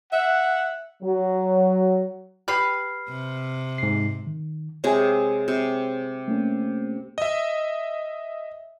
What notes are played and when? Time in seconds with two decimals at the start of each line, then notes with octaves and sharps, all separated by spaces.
0.13 E5 F#5
1.03 F#3
2.48 G4 B4 F6 C7
3.09 C3
3.78 G#2 C7
4.27 D#3
4.84 C3 G#3 G#4 C#5 G#5
5.48 C3
6.28 A3 A#3 C#4
7.18 D#5 E5